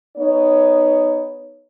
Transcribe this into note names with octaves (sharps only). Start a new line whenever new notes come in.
B3 D#4 C#5